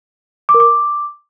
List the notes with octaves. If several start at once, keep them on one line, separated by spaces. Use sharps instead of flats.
D6
A#4
D6